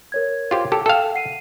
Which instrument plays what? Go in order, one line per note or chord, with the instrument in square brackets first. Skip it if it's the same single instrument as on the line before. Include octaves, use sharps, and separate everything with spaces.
[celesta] A#4 C#5 G#6
[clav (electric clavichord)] F4 G4 C5
G4 A4
[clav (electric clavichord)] A4 F5 [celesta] E5 G5 E7
[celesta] F#5 C7 D#7